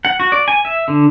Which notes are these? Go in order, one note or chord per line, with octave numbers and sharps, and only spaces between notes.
F#5
F#4
D5
G#5
E5
D3